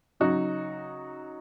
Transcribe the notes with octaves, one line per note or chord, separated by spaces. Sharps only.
C#3 F#3 D#4 F#4